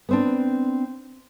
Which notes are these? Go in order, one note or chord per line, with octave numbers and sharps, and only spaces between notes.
B3 C4 D4